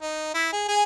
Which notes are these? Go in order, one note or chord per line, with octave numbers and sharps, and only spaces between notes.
D#4
E4
G#4
G#4 G#5